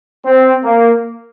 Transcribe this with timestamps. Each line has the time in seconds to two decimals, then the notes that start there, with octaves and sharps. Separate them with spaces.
0.26 C4
0.65 A#3